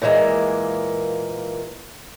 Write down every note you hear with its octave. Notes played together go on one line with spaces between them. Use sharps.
A#2 E3 G3 G#3 A#3